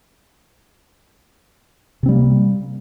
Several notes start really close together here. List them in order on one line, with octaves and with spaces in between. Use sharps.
C3 C4 G3 A#3